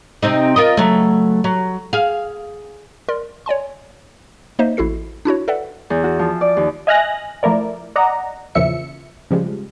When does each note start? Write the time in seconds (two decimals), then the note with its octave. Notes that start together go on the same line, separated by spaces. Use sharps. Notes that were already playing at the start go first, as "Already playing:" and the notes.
0.22 C3 C4 D#4
0.56 F4 A#4 D#5
0.77 C#3 F#3 A3
1.44 F#3
1.93 G#4 F5
3.09 A#4 D5 C6
3.46 C#5 D5 G#5 C6
4.59 A#3 D#4 C5 D#5 E5
4.77 A1 E4 F#4 A4 C7
5.25 D4 E4 F#4 C#5
5.48 A4 B4 D5 E5 F#5
5.90 E2
6.04 F#4
6.19 F3
6.41 D5
6.57 D#2
6.87 D#5 E5 G#5 F6 F#6 A#6
7.43 F3 A3 E4 A#4 D5
7.96 D5 D#5 F#5 A#5
8.55 E2 A#2 C#3 F3 E5 C#7
9.31 C#3 F3 G3 G#3